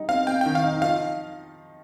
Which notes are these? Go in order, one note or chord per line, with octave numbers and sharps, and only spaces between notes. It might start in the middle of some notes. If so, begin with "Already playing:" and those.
Already playing: G3 D#4
C4 F5
C4 G5
D#3 G5
F5
D#4
F3 F5